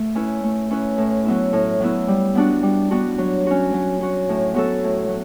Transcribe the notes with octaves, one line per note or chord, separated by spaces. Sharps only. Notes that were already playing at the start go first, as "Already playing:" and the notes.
Already playing: A3
C#4 E4 B4
A3
C#4 E4 B4
A2
F#3 B3 E4
A2
F#3 B3 E4
G3
B3 D4 F#4
G3
B3 D4 F#4
F#3
C#4 F#4
F#3
C#4 F#4
A2
F#3 B3 F#4 A4
A2
F#3